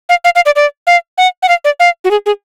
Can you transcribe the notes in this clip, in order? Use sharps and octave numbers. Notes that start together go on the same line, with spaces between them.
F5
F5
F5
D5
D5
F5
F#5
F#5
F5
D5
F5
F#4
G#4
G#4